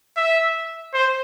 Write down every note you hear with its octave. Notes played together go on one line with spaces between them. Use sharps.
E5
C5